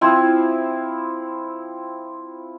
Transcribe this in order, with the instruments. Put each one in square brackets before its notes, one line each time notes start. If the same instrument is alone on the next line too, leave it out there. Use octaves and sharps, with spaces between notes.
[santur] F3 C4 E4